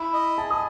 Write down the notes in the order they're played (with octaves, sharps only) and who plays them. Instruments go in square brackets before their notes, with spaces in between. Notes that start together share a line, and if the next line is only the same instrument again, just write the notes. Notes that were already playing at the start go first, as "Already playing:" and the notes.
Already playing: [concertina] E4 [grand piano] B5
[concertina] D#5
[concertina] G#4 [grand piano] A5
[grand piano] D#6